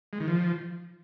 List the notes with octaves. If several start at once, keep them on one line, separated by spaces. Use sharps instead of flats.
G#3
D#3
F3